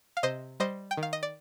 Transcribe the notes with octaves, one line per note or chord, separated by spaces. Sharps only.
F5
C3 C5 D#5
G3 C5 D#5
G5
D#3
F5
D#5
D5